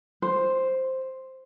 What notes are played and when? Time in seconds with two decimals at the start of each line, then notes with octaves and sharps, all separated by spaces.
0.22 C5